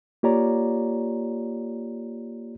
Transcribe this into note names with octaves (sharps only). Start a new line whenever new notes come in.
A#3 F4 G4 C#5 D5 A#5